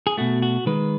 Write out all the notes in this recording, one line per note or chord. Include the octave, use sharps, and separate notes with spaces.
G#4
B2 A3 F#4
F#4
D#3 G#3 B4